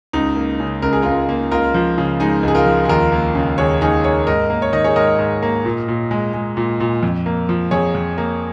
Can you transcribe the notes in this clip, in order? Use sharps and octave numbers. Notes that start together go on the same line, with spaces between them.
C#2 D#4
A#3
C#3
C#2 A#4
G#4
C#2 F4 A#4
A#3
C#2 F4 A#4
F3
C#3
G#3 D#4 G#4
C#2 G#4
F4 A#4
F3
G#4
D#2 F4 A#4
A#3
C#3
D#2 G#4 C#5
D#2 D#4 G#4
A#3 G#4 C#5
G#2 A#4 D#5
A#3
C#5
D#3 D#5
G#4 C#5
G#2 A#4 D#5
G#2
A#3
A#2
A#2
G#3
G#3
A#2
A#2
F2
A#3
F3
F2 G#4 C#5
F2
A#3